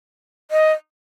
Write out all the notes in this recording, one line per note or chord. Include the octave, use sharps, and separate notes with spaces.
D#5